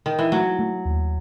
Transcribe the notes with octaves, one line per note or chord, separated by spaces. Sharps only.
D#3
E3
F#3 A3
A3
D#2